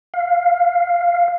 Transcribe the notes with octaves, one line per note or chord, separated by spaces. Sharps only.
F5